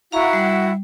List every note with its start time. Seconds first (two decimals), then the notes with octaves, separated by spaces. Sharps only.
0.12 E4 F#4 F5 F#5 A#5 C#6
0.33 G3